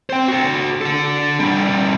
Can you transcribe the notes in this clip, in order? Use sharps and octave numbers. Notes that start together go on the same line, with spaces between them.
C5 G5
F#4 A4
D4 A4
B2 G3